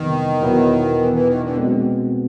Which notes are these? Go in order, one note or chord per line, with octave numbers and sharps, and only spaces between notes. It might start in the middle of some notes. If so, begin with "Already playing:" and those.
Already playing: F2 C3 D#3 E3 G3 B3
E2 B2 F#3 B3 E4
E3
E3
D#3
D3
C2 B2 G#3 C4